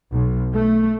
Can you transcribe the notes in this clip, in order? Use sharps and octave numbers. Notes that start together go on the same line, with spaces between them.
B1
A3